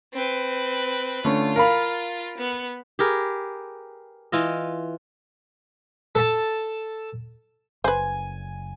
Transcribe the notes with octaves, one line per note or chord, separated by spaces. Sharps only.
C4 B4
D3 A3 C#4 F4
A#4 F5 B5
B3
G4 G#4 A#4 B4
E3 F4 D#5
A4 A5
F#1 B4 C5 G#5